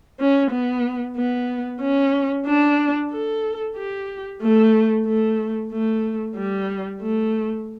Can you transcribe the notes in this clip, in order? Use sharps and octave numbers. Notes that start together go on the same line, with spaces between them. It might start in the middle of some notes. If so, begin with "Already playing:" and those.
C#4
B3
B3
C#4
D4
A4
G4
A3
A3
A3
G3
A3